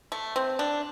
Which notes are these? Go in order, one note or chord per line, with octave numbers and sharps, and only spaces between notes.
A3
C4
D4